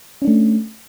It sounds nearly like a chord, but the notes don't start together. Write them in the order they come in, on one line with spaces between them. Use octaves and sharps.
C#4 D4 A3